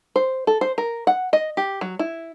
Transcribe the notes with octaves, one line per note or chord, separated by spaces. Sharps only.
C5
A4
C5
A#4
F#5
D#5
G4
F#3
E4